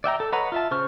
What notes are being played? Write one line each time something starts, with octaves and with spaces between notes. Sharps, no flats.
D5 E5 G5 A#5
A4
B4 C#5 D#5 F#5 A#5
F4 E5 A5
C#3 C5 C#6 F6